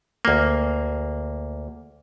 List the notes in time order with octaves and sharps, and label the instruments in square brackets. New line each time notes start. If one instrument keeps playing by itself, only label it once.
[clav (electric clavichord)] D2 A#3